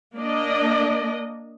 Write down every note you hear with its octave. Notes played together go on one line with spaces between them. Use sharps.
A#3 D4 D5 D#5